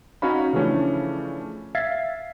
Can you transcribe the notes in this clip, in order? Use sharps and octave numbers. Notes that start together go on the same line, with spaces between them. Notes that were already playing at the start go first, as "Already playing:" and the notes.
C#4 D#4 F#4 C#5 F5 B5
C#3 E3 F3 A3 C#4 D4
E5 F5 G#6 A6 B6 C7